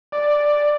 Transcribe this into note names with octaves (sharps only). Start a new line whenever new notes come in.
D5